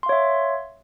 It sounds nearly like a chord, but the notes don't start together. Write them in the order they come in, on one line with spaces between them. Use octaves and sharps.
C6 F5 C#5 E5